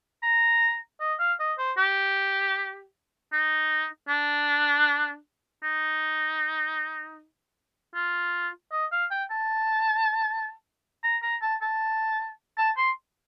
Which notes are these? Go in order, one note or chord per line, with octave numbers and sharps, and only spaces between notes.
A#5
D#5
F5
D#5
C5
G4
D#4
D4
D#4
F4
D#5
F5
G5
A5
A#5
A#5
A5
A5
A5
C6